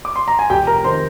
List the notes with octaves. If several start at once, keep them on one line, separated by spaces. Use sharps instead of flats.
D6
C6
A#5
G#5
F1 G4 G5
A#4 A#5
D#3 C5 C6